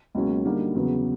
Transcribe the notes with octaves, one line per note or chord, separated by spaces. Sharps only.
C#2 B2 F#3 A#3 C#4
D3 G3 A#3 D#4 F#4
E2 C#3 F#3 B3